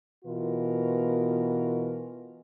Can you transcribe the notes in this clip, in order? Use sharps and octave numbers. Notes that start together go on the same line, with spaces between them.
B2 E3 F4 A#4